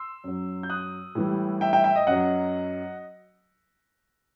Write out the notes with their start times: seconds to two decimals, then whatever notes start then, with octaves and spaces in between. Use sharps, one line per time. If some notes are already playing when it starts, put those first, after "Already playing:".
Already playing: C6 E6
0.24 F#2 F#3
0.63 G6
0.70 D#6 F#6
1.15 A2 E3 G3
1.61 E5 G5
1.73 E5 G5
1.84 E5 G5
1.96 D#5
2.07 F#2 F#3 D#5 F#5